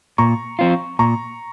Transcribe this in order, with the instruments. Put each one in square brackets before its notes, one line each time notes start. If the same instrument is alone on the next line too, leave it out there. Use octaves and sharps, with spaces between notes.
[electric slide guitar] A#2 [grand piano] A#5 C#6
[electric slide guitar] F3 C4 F4
[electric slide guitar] A#2 [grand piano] A#5 C#6